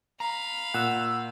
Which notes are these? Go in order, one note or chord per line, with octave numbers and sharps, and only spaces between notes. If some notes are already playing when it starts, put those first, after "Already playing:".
F5 A#5 B5
A#2 F#5 E6